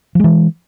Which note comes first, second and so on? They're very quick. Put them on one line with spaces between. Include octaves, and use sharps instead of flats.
F3 G#3 E3